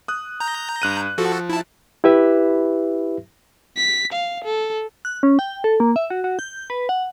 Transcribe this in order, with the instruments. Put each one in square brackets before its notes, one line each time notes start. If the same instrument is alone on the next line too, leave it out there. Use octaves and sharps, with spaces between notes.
[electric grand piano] D#6 F#6
[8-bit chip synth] A#5 G6
[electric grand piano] G2 F#6 D#7
[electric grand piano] F3 [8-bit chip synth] F#4 A4
[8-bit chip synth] E4 A5
[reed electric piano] E4 G4 B4 E5
[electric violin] B6
F5
A4
[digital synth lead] F#6
C#4
G5
A4
A#3
E5
F#4
F#4
G6
B4
F#5